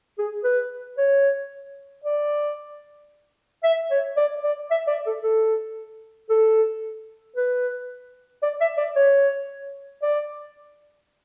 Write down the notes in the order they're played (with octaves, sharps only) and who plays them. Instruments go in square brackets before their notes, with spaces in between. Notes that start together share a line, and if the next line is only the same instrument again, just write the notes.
[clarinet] G#4
B4
C#5
D5
E5
C#5
D5
D5
E5
D5
A4
A4
A4
B4
D5
E5
D5
C#5
D5